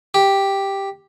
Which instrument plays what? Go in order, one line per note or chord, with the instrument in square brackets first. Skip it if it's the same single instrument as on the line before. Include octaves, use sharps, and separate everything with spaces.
[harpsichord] G4